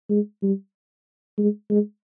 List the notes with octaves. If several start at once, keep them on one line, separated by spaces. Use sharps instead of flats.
G#3
G3
G#3
G#3